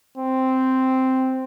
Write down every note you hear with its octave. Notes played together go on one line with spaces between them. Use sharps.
C4